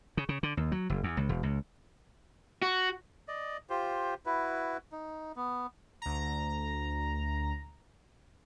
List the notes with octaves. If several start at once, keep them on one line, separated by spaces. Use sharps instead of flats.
C#3
C#3
D3
D#2
F#3
F#1
E2
C#2
E1
C#2
F#4
D5 D#5
F4 G4 C5
E4 F#4 B4
D#4
B3
D2 A#5